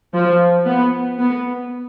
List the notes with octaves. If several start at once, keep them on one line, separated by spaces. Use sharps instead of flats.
F3
B3
B3